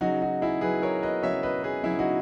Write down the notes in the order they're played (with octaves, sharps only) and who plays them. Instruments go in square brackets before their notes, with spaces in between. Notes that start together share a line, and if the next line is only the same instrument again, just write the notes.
[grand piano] C#3 F#3 D#4 F#4
D#4 F#4
E4 G#4
C#3 F#3 G#4 B4
A#4 C#5
B4 D#5
C#3 F#3 C#5 E5
B4 D#5
G#4 B4
C#3 F#3 E4
D#4 F#4